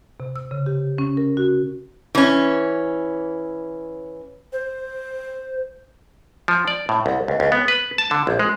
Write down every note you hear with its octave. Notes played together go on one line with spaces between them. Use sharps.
C3
E6
C#3
G4
C#4
A#4
F#4
E3 C#4
C5
F3
D5
A2
C2
C#2
C#2
B3
B4
A5
D3
A#1
G#3